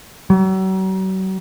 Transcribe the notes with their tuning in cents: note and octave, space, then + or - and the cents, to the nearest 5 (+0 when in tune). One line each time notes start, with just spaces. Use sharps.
F#3 +40